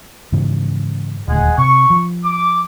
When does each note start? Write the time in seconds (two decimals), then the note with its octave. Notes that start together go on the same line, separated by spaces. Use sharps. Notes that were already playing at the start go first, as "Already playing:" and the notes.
0.32 G#2 C#3 E3
1.28 D#1 D2 G#3 F#5 G#5
1.58 C3 C#6
1.90 F3
2.24 D6